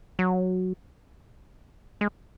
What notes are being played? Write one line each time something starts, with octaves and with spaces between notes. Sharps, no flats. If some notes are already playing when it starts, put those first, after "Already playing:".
F#3
G#3